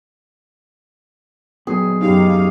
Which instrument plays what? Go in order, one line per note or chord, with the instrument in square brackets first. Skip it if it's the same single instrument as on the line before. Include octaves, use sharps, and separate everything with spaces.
[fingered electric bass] D#1 F#3 B3 [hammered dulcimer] G#4
[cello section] F#2 F5 [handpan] D#4 G4